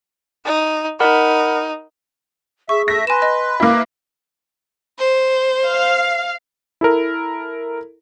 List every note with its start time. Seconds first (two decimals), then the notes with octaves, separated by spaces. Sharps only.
0.45 D#4
1.00 D#4 A#4 F#5 B5
2.69 G#4 E5 C#6
2.88 A3 E5 A#6
3.07 B4 G#5 C6 E7
3.22 D#5
3.60 A#3 E4 D6
4.99 C5
5.71 F5
6.81 E4 A4 A#4